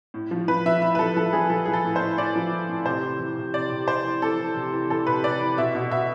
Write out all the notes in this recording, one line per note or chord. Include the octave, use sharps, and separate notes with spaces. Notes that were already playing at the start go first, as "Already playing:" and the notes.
A2
F3
F3 B4
F3 E5
A2 E5
B4
F3 A4
F3 A4
F3 G#4
F3 A4
G#4
F3
A4
A2
C5
A2
A2 D5
F3
A2
A2
C3 C5
E3
E3
C3
C3 D5
C3
C3 C5
E3
E3 A4
E3
C3
E3
E3 A4
C3 B4
C3 D5
E3
B2 E5
B2
B2 E5